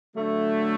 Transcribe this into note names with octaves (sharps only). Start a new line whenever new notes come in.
D3 F#3 A3